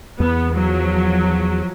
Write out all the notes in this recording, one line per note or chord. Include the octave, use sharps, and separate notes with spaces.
E2 B3
F3 F#3